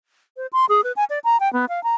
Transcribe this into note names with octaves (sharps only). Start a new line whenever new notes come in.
C5
C6
G#4
B4
G#5
D5
A#5
G5
B3
F5
A#5